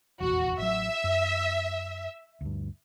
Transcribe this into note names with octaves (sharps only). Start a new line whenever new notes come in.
F1 A#1 E2 F#4
A1 F#3 E5
F#2
D2 G2